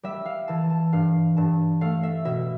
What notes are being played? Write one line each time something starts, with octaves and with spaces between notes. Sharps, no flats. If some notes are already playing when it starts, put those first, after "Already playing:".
G3 E5
F5
E3 A5
A5
G2 F5
G2 A5
A3 F5
E5
B2 E5